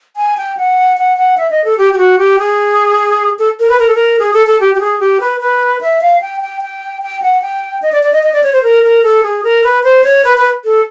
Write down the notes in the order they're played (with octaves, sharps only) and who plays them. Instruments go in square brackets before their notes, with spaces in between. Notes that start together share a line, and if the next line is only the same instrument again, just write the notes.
[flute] G#5
G5
F#5
F#5
F#5
E5
D#5
A4
G4
G4
F#4
G4
G#4
A4
A#4
B4
A#4
A4
A#4
G#4
A4
A4
G4
G4
G#4
G4
B4
B4
E5
F5
G5
G5
G5
G5
F#5
G5
D#5
D5
D5
D#5
D#5
D5
C#5
C5
A#4
A#4
A4
G#4
A#4
B4
C5
C#5
B4
B4
A4